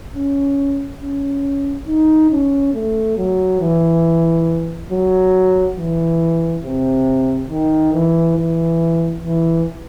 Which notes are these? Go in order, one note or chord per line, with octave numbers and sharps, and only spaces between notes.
C#4
C#4
D#4
C#4
A3
F#3
E3
F#3
E3
C3
D#3
E3
E3
E3